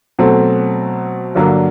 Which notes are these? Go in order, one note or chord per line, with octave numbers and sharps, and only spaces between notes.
B2 F#3 A3 C4
G2 D3 F#3 A#3